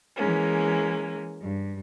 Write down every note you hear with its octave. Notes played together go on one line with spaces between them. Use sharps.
E3 G#3 A#3 C#4
G2